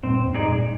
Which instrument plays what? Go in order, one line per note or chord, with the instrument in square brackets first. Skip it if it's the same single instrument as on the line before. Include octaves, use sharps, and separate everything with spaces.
[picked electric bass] G2 A#2 [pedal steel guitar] C4
[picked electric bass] F2 G#2
[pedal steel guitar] D#4 G#4 D5
[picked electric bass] G2 A#2